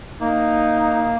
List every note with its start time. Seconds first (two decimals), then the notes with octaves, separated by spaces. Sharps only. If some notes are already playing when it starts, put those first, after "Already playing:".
0.20 A#3 D#4